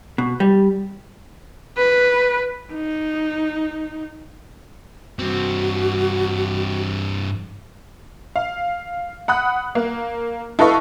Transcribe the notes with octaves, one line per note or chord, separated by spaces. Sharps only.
B2
G3
B4
D#4
G2 C4 F#4
F5
F#5 B5 D#6 F#6
A#3
E4 A4 B4 D#5 F5 C#6